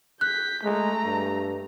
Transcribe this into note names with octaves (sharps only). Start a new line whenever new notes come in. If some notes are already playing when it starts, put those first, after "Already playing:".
F#6 G6 B6
G#3 A3 A#5
G2